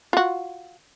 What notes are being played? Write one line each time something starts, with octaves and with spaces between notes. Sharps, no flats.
F4 F#4